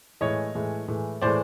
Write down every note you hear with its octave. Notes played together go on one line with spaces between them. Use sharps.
A2 E3 G#3 C#5 D#5
A2 E3 G#3
A2 E3 G#3
A2 E3 G#3 C5 D5